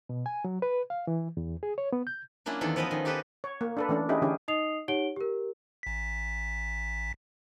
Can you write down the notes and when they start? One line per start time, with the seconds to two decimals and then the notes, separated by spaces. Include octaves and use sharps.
0.09 B2
0.26 G#5
0.45 F#3
0.62 B4
0.90 F5
1.07 E3
1.37 E2
1.63 G#4
1.78 C#5
1.92 B3
2.07 G6
2.46 F#3 A#3 C#4 D4 E4 F4
2.61 E2 D#3 F4 A4
2.76 F3 B3 B4 D#5 G5 B5
2.91 D#3 C#4
3.05 D#4 G4 A4 B4 C5 D#5
3.44 C#5
3.61 A#3
3.77 D4 A4 B4
3.89 E3 A3 C#4 D4
4.09 C#4 D#4 E4 G4 G#4
4.22 D3 E3 C#4 G4 G#4
4.48 D#4 D#5 D#6 C7 F7
4.88 D#4 G4 C#5 F#5 D7 G7
5.16 G4 A#4
5.83 A1 B6